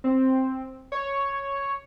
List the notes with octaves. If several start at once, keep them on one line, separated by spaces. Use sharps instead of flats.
C4
C#5